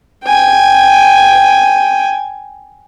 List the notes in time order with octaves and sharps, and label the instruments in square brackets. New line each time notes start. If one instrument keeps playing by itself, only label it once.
[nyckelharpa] G5 G#5